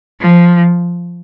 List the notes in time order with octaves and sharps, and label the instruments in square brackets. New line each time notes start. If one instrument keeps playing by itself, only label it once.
[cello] F3